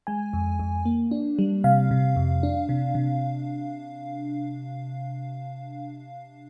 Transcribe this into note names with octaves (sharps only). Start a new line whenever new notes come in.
G#3 G#5
F2
F2
A#3
D4
G3
C3 F5
C3
F2
D4
C3
C3